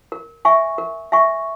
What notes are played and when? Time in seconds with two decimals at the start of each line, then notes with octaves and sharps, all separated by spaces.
0.12 A#4
0.45 E5 G#5 C#6
0.78 A#4
1.12 E5 G#5 C#6